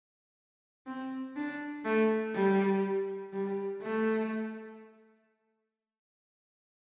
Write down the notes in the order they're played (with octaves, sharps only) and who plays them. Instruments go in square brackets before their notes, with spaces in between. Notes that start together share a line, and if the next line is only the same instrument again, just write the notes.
[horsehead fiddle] C4
D4
A3
G3
G3
A3